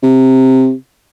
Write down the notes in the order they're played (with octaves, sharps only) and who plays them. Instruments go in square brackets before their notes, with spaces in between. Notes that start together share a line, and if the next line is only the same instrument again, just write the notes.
[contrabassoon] C3